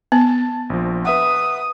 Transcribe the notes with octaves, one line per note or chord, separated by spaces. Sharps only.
B3 A5
A#1 F3
B4 E5 F#5 D#6